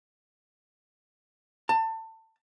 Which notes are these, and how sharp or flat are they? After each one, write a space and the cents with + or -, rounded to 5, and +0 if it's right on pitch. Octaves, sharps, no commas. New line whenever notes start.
A5 +25